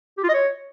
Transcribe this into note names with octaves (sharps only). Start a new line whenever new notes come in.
G4
F4
D#5
C#5